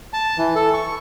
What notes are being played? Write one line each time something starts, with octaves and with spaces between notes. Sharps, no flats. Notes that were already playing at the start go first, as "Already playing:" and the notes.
A5
E3
A4
C#6